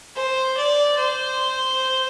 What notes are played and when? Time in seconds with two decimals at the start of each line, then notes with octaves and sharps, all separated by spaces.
0.15 C5
0.57 D5
0.97 C5